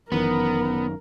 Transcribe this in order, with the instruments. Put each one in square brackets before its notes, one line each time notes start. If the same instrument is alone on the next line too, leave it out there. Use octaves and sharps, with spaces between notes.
[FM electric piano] G1 E3 B5 [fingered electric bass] F#2 D#3 [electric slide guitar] B3 [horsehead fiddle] A#4